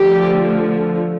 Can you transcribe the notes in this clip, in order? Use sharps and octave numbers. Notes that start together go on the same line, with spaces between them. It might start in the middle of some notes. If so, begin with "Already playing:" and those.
Already playing: D3 F3 A3 G4